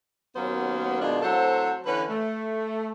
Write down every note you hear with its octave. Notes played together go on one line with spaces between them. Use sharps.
D#2 F#3 A#3 B3 C#4 C5
B2 D#3 G#3 D4 F4
A2 F#3 C4 A4 C5 F#5
D3 E3 C#4 B4
A3